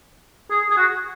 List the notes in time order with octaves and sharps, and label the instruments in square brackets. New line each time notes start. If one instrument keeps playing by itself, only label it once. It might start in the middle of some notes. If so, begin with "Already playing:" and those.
[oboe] G#4
G#4
F#4